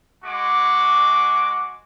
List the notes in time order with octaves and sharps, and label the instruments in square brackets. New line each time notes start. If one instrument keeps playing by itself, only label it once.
[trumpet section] G#3 F#4 D6